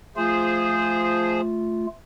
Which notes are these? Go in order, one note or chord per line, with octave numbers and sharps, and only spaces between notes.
F3 A3 F4 G#4 C5